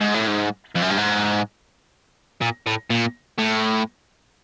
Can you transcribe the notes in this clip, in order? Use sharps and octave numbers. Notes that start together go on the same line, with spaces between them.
G#2
A2
G#2
F2
F#2
G2
G#2
A#2
A2
A#2
A2